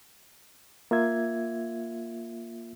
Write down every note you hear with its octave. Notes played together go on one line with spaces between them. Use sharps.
A#3 F4 E5 G#6